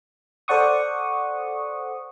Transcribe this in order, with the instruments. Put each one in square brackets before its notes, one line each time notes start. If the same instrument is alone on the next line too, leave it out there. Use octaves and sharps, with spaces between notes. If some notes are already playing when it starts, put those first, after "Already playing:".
[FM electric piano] A4 C5 D5 F#5 C#6 D#6